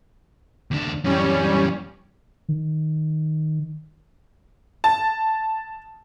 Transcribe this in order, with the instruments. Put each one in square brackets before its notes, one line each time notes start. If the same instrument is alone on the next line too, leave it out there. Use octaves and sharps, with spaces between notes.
[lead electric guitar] D#2 D4
[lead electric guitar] F#2 E3 [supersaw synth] G3 C#4
[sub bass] D#3
[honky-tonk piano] A5